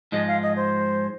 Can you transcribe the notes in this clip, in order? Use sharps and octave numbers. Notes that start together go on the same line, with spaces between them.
G#2 F3 G#3 D#5
F5
D#5
C5